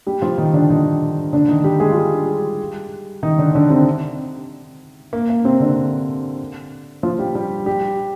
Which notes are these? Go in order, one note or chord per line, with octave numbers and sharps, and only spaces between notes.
G3 G4
F3 F4
D#3 D#4
D3 D4
D#3 D#4
D3 D4
D#3 D#4
G3 G4
G#3 G#4
F4
G3 G4
D#3 D#4
D3 D4
D3 D4
C3 C4
A#3
A#3
C3 C4
D3 D4
F3 F4
G3 G4
G3 G4
G3 G4